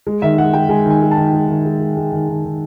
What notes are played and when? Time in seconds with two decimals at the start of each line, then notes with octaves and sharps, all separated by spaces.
0.07 G#3
0.22 D#3 E5
0.38 G#3 F#5
0.53 G#3 G5
0.69 G#3 G#5
0.86 D#3 G#5
1.02 G#3
1.11 A5
1.17 D#3
1.33 G#3
1.48 D#3
1.65 G#3
1.80 G#3
1.97 G#3
2.12 D#3
2.29 D#3
2.45 D#3